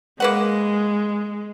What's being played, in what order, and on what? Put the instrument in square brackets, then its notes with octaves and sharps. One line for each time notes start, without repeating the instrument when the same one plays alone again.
[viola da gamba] G#3 [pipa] A#3 B4 F#5